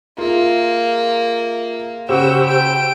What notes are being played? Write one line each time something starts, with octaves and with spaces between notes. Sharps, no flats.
A#3 F4 G#4 E5
C#3 F#4 G4 C5 G5 E6
G5 D7